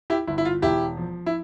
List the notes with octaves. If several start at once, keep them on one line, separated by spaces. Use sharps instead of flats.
E4 G4
G1 E4
E4
F4
E1 E4 G4
F3
E4